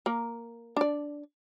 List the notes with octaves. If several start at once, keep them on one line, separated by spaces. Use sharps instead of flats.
A#3 A#4
D4 D5